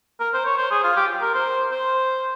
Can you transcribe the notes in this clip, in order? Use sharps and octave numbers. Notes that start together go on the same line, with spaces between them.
A#4
C5
C#5
C5
G#4
F4
G4
A#4
C5
C5